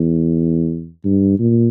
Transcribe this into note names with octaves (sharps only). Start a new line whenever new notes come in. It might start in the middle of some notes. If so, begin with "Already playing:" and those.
Already playing: E2
G2
A#2